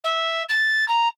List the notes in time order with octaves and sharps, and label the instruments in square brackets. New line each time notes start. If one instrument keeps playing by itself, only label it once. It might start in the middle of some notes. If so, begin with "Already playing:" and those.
[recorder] E5
A6
A#5